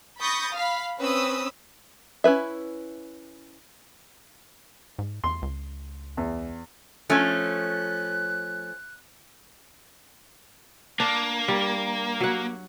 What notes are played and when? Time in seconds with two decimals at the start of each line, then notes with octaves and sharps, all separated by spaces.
0.20 B5 C#6 D#6 G6 A6 A#6
0.53 F5 B5
1.00 C4 C#4 B4 B5 D#6 E6
2.24 C#4 E4 B4 E5
4.99 G#2
5.24 E2 C6
5.42 C#2
6.17 E2
7.10 F3 A3 C#4 F#6
11.00 A#3 D4
11.48 G3
12.21 F#3 F#5